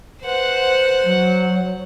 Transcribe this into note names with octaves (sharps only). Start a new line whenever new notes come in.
B4 C5 F#5
F#3